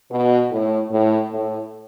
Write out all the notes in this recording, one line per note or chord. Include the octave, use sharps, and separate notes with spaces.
B2
A2
A2
A2